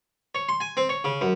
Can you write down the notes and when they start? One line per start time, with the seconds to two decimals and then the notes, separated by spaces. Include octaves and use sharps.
0.35 C#5
0.49 C6
0.60 G#5
0.77 C4
0.89 C#5
1.04 C#3
1.21 F#2